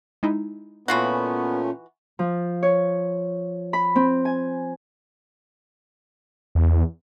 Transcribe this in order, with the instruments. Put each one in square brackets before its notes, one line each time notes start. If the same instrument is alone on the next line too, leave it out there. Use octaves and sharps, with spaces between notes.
[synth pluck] G#3 D#4 E4
[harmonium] A#2 A3 C#4 [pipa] E3 F4 F#4 [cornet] B3
[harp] F3
C#5
B5
C4
G#5
[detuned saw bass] E2